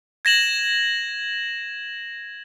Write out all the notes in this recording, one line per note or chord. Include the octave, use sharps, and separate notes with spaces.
G#6 A#6 E7 F#7